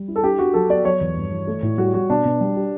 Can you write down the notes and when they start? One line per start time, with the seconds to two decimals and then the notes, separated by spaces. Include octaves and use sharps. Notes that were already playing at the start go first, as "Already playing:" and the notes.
Already playing: G3
0.08 E4
0.16 A4
0.23 D4 G4
0.39 D4 F#4
0.54 F#3 A4
0.70 B3 D5
0.85 F#3 C#5
1.01 E2
1.17 G2
1.31 E3
1.47 A3
1.63 A2
1.78 G3 F#4
1.94 G3 F#4
2.10 B2 D4
2.25 B2
2.41 G3
2.56 G4